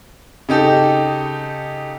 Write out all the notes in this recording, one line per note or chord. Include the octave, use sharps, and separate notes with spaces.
C#3 D#4 G4 A4